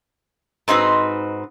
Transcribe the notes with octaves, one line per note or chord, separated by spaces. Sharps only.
G#2 C4 D#4 F#4 B4